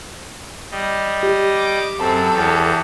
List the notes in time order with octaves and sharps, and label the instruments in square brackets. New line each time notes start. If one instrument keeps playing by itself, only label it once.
[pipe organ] G3 D#5
[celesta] G4
[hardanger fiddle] D6
[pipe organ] F#2 [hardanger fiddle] C4 [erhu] A4
[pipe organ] E2 [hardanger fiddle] G4 C#5